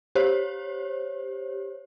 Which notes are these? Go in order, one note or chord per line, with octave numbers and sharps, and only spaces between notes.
G4 C5 C#5